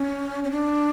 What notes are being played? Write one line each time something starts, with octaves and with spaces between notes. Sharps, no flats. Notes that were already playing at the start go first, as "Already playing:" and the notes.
Already playing: C#4
C#4
D4